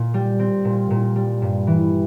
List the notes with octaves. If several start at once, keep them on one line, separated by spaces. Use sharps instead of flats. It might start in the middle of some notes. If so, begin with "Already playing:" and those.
Already playing: A#2
G3
C4
A#2
A#2
G3
G2
E3